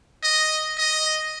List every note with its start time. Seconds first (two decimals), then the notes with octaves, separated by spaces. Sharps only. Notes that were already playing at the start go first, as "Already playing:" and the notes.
0.23 D#5
0.78 D#5